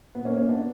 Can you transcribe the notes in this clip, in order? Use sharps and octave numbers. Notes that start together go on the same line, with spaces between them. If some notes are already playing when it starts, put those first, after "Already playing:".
A#2 B3
A#3 C#4
A#3 C#4
B3 D4